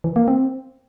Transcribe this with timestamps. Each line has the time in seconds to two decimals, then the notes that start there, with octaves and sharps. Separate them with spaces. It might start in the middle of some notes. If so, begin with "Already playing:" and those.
0.04 E3
0.16 A#3
0.28 C4